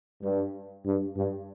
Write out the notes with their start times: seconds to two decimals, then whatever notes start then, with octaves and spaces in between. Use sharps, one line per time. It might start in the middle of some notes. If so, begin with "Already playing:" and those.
0.22 G2
0.85 G2
1.16 G2